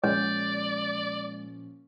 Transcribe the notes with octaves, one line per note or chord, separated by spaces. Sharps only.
A#2 F3 G#3 C#4 C#5 D5